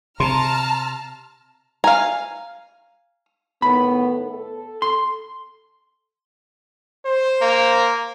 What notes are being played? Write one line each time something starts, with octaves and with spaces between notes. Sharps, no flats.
C3 A5 A#5 C6 F6
F5 G#5 A#5
A2 D#3 B3 B5
A4
C6
C5
A#3